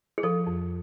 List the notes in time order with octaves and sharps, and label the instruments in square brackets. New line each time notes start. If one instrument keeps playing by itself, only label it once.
[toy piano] G#4
[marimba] F3 [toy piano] A4
[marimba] F2